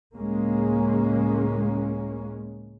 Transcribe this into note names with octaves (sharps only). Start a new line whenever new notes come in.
C#2 A2 G#3 A#3 C#4